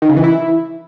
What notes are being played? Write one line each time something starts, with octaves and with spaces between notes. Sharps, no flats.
D#3
C#3
E3
E4